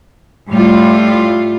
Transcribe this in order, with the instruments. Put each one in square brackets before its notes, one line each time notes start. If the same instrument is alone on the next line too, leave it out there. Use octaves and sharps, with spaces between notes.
[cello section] A2 G3 A3 F4